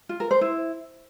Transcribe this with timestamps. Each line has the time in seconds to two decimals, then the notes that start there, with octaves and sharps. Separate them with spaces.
0.09 F4
0.20 A#4
0.31 C5
0.41 E4